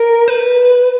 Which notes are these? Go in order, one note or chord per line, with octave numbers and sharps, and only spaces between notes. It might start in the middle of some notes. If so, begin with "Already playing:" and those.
Already playing: A#4
B4